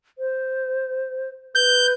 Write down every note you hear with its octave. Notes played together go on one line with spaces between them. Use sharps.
C5
B4 G6